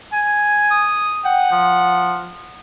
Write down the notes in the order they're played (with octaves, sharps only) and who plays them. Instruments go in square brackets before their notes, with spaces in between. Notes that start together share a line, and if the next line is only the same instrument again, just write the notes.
[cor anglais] G#5
[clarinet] D#6
[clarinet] F#5 [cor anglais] G5
[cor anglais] F3